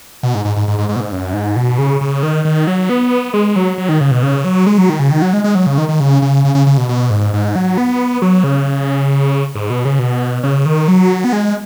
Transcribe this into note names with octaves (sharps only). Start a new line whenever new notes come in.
B2
G#2
G#2
G#2
G#2
G#2
G#2
B2
G#2
F#2
G#2
B2
C#3
C#3
D#3
D#3
F#3
B3
G#3
F#3
F#3
D#3
C#3
B2
C#3
F#3
G#3
F#3
D#3
C#3
D#3
F#3
G#3
G#3
F#3
C#3
D#3
D#3
C#3
C#3
C#3
C#3
C#3
B2
B2
G#2
G#2
F#3
B3
F#3
C#3
G#2
B2
C#3
B2
C#3
D#3
F#3
B3
G#3